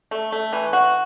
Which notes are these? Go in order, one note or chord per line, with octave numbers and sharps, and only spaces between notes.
A3
A3
E3
F#4